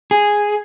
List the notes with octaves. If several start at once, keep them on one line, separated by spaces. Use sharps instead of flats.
G#4